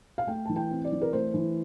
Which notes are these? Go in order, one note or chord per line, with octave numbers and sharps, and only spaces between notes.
F5
A3 G5
E3 A5
G5
C4
D5
E3
A#4
A3 C5
E3